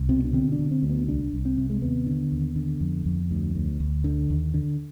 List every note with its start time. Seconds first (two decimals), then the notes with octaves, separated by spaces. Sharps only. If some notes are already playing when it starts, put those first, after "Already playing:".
Already playing: C2
0.09 B2 C4
0.24 D4
0.33 D3 C4
0.52 D4
0.59 D3
0.71 C4
0.83 D2
0.90 B3
1.08 C2 D4
1.33 C2
1.45 C4
1.57 C3
1.70 G#3
1.82 D#2 B3
2.06 D3
2.32 D#2
2.56 D3
2.81 F2
3.06 F2
3.31 D2
3.55 D2
3.80 D2
4.04 D3
4.30 D#2
4.54 D3